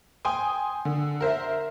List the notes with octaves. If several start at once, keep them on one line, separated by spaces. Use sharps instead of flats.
G5 G#5 C6 D#6
D3
A#4 C5 E5